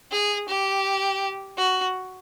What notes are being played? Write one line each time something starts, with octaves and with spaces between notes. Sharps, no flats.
G#4
G4
F#4